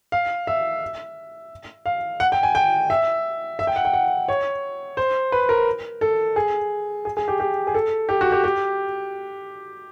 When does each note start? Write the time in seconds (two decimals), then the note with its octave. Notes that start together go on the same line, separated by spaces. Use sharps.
0.12 F5
0.47 E5
1.86 F5
2.20 F#5
2.32 G5
2.43 G#5
2.55 G5
2.90 E5
3.59 E5
3.67 G5
3.76 F#5
3.85 G5
3.93 F#5
4.28 C#5
4.97 C5
5.32 B4
5.49 A#4
6.01 A4
6.36 G#4
7.05 G#4
7.17 G#4
7.28 G4
7.40 G4
7.67 G#4
7.74 A4
8.09 G4
8.21 F#4
8.32 G4
8.44 G4